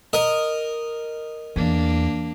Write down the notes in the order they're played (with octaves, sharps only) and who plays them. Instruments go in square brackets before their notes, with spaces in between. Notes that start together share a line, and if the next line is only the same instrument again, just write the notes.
[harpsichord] A#4 D#5
[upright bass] E2 [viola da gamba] A#3 D4